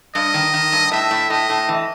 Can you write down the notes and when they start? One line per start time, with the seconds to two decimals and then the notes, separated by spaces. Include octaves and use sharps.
0.15 G2 D#5
0.34 D#3
0.54 D#3
0.72 G2
0.92 A2 E5
1.11 A2
1.30 A2 D#5
1.50 A2
1.69 E3